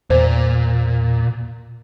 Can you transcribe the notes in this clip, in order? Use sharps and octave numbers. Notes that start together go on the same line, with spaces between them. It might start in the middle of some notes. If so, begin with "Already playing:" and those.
E2 A#2 C5